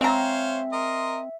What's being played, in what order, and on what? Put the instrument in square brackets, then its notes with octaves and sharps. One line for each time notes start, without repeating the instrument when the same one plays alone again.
[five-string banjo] G#3 A#5 [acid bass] C4 [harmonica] C5 C#5 F5 [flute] E5
[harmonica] A#4 D#5 C6